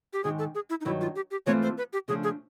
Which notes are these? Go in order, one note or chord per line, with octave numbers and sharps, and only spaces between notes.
G4
G#2 D#3 G#3 G#4
A4
G#4
E4
D#4
G2 D#3 F#3 E4
F4
G4
G4
G#2 E3 A3 C4 F4 C#5
C5
B4
G4
C#3 F3 A3 D4 G#4
G#4